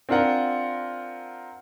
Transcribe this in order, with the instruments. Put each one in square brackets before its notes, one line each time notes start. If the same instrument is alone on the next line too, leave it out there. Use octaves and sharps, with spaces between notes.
[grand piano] C4 D4 F4 A#4 F#5